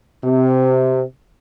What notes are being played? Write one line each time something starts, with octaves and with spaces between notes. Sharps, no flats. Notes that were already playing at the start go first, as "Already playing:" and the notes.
C3